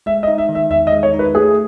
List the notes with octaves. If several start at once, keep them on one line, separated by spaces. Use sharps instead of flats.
G#3 E5
D#5
D#4
E5
D#3
E5
E2 E5
D#5
G#3
C#5
D#4
B4
A3 G#4